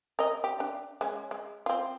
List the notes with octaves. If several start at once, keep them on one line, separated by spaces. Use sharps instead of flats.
A#4 D#5
G4
D4
G#3 C#4
G#3
C4 F4